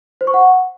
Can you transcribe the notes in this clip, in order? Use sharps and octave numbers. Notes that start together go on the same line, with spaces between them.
C5
C#6
F#5